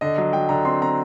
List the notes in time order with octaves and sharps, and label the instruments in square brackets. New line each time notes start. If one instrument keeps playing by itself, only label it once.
[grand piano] D3 D#5
F#3 D#5
F#3 G5
D3 A#5
C4 C6
C4 A#5